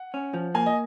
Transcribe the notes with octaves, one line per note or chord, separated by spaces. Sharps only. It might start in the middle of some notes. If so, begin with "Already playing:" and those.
Already playing: F#5
C#4
F3
A#3 G#5
D#5